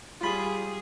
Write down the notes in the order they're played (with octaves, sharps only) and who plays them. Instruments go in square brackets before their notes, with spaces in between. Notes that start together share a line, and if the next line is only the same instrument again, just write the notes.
[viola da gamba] G3 G#4 [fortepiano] F4 B5